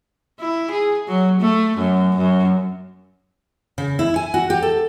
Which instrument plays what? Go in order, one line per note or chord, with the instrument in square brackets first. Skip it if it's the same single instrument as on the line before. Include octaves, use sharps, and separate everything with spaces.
[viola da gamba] E4
G#4
F#3
A3
F#2
F#2
[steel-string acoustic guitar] C#3
E4
G#5
F#4
G4
A4